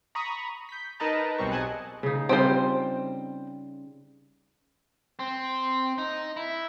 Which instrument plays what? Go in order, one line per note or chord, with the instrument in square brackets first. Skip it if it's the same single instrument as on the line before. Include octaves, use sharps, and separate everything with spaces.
[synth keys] A#5 B5 C#6 D#6
G6 B6
D#4 A#4 B4 D#5 A5 A#5
B1 B2 G3 C4 C#6
G#4 D#5 F#5 G#5 A5 F#6
[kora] C#3 D#4
[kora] C#3 G3 F4 [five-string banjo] C4 C5
[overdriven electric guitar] C4
D#4
E4